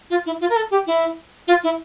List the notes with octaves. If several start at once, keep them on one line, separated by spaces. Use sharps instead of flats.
F4
E4
F4
A#4
A4
G4
E4
F4
E4